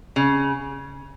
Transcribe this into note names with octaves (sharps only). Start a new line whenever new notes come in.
C#3